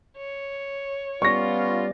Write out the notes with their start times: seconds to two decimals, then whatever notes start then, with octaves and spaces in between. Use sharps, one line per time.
0.17 C#5
1.22 G3 B3 C#4 F4 D5 C#6 A#6